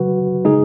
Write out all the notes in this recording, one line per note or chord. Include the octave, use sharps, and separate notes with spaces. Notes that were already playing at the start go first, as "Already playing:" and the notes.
Already playing: C#3 F#3 F#4 B4
C#3 G#3 D#4 G#4